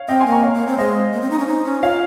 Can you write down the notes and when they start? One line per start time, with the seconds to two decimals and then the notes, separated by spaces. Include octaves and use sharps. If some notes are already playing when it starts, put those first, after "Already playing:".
Already playing: C#5 F5
0.08 C4 D#5 G5
0.20 G#5 C6
0.26 A#3
0.32 A#5 C#6
0.43 C#5 F5
0.55 A#3
0.67 C4
0.78 G#3 C5 D#5
1.13 A#3
1.22 C4
1.31 D#4
1.39 C#4
1.47 D#4
1.65 C#4
1.82 F4 C#5 F5